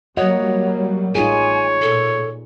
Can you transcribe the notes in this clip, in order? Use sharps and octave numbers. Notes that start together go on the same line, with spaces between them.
F#3 G3 A#3 F#4 C#5 D#5 F#5
A1 D#4 F4 G#4 C#5 G#5
A#2 A4